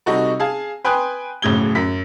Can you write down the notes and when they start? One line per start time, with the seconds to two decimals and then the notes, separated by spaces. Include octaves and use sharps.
0.06 C3 G3 D#4 F#4 A4
0.40 G#4 F5 G#5 A5
0.84 B4 G5 G#5 C6 D#6 F#6
1.42 D1 A2 C#3 G#6 G7
1.75 F#2 B6